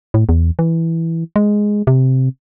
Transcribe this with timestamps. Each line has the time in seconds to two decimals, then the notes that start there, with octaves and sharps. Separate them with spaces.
0.14 A2
0.29 E2
0.59 E3
1.36 G#3
1.87 C3